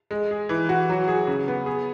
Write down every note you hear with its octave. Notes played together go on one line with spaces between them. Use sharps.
G#3
G#4
E3
F#4
F#3
G#4
C#3
B3
G#4